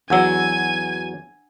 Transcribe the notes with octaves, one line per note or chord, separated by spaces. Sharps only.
E2 F#3 D4 F#5 G#5 E6